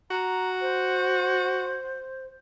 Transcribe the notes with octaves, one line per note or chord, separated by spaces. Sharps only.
F#4 A#5
C5